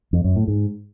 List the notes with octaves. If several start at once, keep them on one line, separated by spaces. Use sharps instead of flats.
F2
F#2
A2
G#2